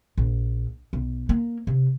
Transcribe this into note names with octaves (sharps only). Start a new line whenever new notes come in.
A#1
B1
A#3
C3